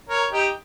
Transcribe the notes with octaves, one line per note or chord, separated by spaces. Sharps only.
A#4 C#5
D#4 G4